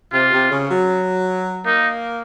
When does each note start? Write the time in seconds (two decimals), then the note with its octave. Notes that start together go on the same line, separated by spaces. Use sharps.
0.13 C3 F4
0.32 C3
0.50 C#3
0.71 F#3
1.66 A#3 D#4